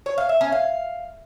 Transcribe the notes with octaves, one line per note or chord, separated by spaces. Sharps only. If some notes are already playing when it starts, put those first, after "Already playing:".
C#5
F5
E5
C#4
F5